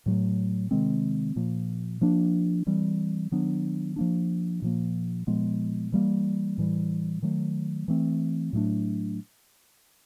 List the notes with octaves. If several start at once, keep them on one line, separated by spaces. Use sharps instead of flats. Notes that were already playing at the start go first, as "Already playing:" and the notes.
A2 F#3 A3
C3 D#3 G#3 C4
A#2 F3 A#3
F3 A#3 D4
E3 G3 C4
D#3 F#3 B3 D4
F3 A#3 D4
A#2 F3 A#3
A#2 F3 G#3 B3
E3 G3 A#3
A2 E3 G3
D#3 F#3 A3
E3 A3 C4
A2 F#3 A3 D4